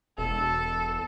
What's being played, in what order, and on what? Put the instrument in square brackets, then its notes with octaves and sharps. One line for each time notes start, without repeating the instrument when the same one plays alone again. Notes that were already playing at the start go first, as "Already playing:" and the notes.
[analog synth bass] E1 [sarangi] A4